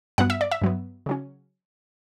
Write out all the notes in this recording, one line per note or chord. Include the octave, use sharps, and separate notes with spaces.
G2 F#3 B3 F#5
E5
D5
E5
G2 F#3 B3
C#3 F#3 C#4